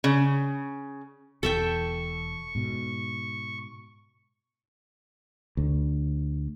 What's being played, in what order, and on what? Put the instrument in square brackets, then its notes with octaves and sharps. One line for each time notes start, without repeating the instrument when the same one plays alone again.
[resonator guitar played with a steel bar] C#3
[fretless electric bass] E1 E2 [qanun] A4 E5 G5 [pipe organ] C#6
[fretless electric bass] G#2 B2
D2